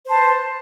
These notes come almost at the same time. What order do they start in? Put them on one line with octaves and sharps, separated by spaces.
C5 A5 B4